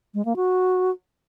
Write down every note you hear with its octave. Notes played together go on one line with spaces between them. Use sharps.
G#3
A#3
F#4